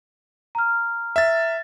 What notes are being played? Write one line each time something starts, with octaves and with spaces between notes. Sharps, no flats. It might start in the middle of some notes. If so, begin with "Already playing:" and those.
A#5 F6
E5 A6